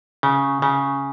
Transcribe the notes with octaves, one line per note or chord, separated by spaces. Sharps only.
C#3
C#3